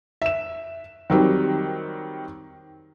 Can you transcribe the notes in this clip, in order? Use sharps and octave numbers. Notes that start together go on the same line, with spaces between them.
E5 E7
D#3 F#3 G3 C4